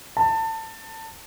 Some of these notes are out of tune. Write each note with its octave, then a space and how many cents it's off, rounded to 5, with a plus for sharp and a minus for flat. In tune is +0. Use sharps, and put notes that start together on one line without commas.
A5 +25